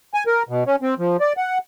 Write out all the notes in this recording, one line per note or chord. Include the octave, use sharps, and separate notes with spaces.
G#5
A#4
B2
C#4
C4
F3
D5
F#5